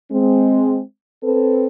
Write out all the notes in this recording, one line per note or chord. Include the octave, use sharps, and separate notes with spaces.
G#3 C4
C4 A4 B4